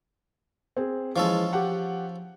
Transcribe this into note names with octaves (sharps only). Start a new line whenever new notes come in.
C4 G#4
E3 F3 G#3 C#4 A4
G4 F#5